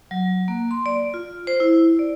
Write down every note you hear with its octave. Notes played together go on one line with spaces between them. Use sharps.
F#3
A#3
C6
D5
F4
C5
E4
D5